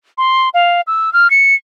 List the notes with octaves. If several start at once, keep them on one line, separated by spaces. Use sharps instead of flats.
C6
F5
E6
F6
C#7